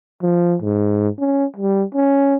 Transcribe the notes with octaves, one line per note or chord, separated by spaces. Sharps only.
F3
G#2
C#4
G3
C#4